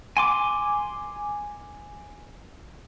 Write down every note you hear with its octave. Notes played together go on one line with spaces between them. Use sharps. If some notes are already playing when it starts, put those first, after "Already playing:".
G#5 C6 D6